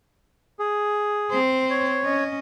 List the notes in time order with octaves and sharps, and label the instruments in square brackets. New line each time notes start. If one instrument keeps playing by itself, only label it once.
[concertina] G#4
[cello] C4 C5
[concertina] C#5
[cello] C#4 D#5